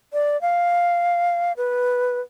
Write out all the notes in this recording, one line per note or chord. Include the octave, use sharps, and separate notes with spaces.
D5
F5
B4